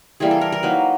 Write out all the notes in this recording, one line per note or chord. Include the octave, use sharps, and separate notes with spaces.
E3 G3 A#3 G#4
A4
A#4
A#4
F#3 A#3 D#4 B4